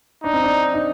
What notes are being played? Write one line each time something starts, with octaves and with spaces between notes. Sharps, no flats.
D4 D#4
C4
D4
D#4